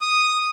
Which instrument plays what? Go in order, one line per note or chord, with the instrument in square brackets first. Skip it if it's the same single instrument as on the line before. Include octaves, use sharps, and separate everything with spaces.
[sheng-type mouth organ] D#6